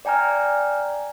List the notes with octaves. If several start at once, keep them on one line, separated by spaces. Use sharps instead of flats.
D5 G5 G#5 A#5 F6